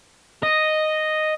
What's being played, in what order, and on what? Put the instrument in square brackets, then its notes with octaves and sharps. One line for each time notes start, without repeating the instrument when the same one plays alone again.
[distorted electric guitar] D#5